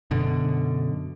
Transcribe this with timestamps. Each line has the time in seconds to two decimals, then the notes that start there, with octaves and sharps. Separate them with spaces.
0.11 F#2 B2 D3